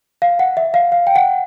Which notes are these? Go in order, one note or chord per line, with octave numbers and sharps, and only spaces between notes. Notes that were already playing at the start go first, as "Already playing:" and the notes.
F5
F#5
E5
F5
F5
G5
F#5